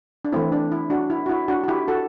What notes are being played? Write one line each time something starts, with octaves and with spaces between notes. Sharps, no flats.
D4
E3 A3 C4 E4
D4
E4
D4 F#4
E4
F#4
E4
D4 F#4
F#4
E4 G4
F#4 A4